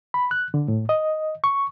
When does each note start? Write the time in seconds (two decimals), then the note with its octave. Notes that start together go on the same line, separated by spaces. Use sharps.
0.14 B5
0.31 F#6
0.54 D3
0.68 A2
0.89 D#5
1.44 C#6